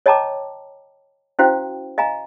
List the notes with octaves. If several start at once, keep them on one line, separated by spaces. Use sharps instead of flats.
C#5 D#5 G5 A5 A#5 D6
C#4 E4 F#4 C5 F5 G5
D#5 F5 G#5 A#5